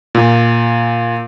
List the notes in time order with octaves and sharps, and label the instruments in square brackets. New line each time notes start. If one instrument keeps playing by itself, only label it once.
[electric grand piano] A#2